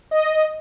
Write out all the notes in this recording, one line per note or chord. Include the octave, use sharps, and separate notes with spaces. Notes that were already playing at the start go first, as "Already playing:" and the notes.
D#5